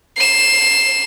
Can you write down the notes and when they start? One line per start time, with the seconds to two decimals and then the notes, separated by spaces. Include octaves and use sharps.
0.17 C7 E7